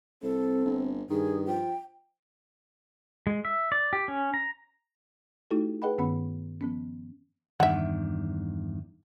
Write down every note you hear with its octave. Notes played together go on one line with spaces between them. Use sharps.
C2 C4 A4
G1
G2 D#3 G#4
F3 G5
G#3
E5
D5
G4
C#4
A#5
A3 D#4 E4 F#4 G4 A4
G#4 B4 D#5 F#5 G5 B5
G2 D#3 B3 C#4 F#5 B5
F3 B3 C#4
E2 G2 D#3 E5 F#5